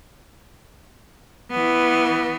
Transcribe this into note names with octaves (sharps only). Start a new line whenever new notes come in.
E3 B3